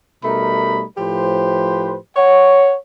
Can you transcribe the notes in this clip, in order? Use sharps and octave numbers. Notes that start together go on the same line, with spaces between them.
B2 G3 A3 D#4 A#4 B5
A2 F3 G4 B4 C5
C#5 F#5